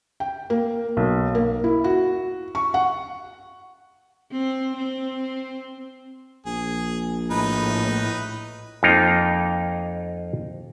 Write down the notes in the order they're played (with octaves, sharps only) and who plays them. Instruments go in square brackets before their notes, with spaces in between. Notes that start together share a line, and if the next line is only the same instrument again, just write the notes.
[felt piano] G5
A#3
B1
A#3
E4
F#4
C#6
F#5
[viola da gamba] C4
C4
[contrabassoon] A#1 [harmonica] G#4
[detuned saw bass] A2 [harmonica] D#4 B4
[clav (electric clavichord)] F2 A#3 D#4 F4 G5 A#5